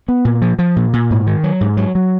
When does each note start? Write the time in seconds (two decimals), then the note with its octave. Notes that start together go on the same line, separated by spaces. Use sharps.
0.08 B3
0.25 A#2
0.42 F3
0.59 F3
0.76 A#2
0.93 A#2
1.10 G#2
1.27 D#3
1.44 F#3
1.61 G#2
1.77 F#3
1.95 F#3